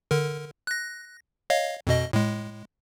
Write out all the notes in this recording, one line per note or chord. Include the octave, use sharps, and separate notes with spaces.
D3 A#4
F#6 A#6
C#5 D#5 F5
F2 B2 D#5
A2 G#3